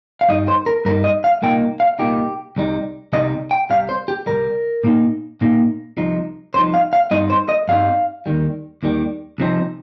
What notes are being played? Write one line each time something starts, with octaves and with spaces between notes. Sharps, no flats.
F5
G2 G3 D#4 D#5
C5
A#4
G2 G3 D#4 A#4
D#5
F5
C2 A#2 A#3 D#4 G5
F5
C2 A#2 A#3 D#4 G4
C2 C3 G3 D#4
C2 C3 G3 D#4 D#5
G5
C2 C3 G3 F5
C5
G4
C2 C3 G3 A#4
A#2 A#3 D#4
A#2 A#3 D#4
C2 C3 F3 D#4
C2 C3 F3 D#4 C5
F5
F5
G2 G3 C4 D#4 D#5
C5
D#5
G2 G3 C4 D#4 F5
D#2 D#3 G3
D#2 D#3 G3
C2 C3 F3 C4 D#4